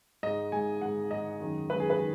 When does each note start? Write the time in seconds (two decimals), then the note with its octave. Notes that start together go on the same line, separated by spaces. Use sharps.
0.23 G#2 G#3 D#5
0.52 G#2 G#3 G#5
0.81 G#2 G#3 F#5
1.11 G#2 G#3 D#5
1.41 F#2 D#3 G#3
1.70 F#2 D#3 G#3 B4
1.80 G#4
1.90 B4
1.99 D#3 G#3